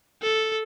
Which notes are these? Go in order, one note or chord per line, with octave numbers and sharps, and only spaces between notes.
A4